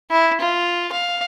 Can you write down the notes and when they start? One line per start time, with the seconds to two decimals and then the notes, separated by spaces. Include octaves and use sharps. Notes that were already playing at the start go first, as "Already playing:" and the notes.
0.11 E4
0.41 F4
0.92 F5